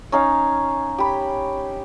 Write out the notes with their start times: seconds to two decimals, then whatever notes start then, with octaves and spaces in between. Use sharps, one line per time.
0.12 C#4 D#4 F5
0.99 G4 B5